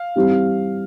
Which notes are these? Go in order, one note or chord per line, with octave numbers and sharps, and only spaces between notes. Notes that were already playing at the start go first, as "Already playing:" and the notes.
Already playing: F5
E3 G3 C4 G4